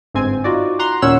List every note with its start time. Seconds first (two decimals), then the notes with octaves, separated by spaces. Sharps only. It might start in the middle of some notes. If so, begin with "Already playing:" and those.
0.14 G1 G#2 C4 G#5
0.44 D#4 F4 F#4 D5
0.79 F#5 A#5 C6
1.02 D#2 A#2 C#4 C#5 F#5 E6